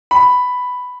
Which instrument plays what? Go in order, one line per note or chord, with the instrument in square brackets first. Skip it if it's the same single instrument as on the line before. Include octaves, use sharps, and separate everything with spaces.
[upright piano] B5